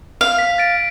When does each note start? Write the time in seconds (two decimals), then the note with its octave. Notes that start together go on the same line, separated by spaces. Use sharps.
0.21 F5
0.39 B6
0.58 A6 D7